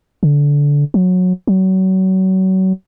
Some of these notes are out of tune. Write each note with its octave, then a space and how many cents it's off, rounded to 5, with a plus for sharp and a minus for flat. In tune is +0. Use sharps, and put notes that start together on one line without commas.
D3 -20
F#3 -20
F#3 +30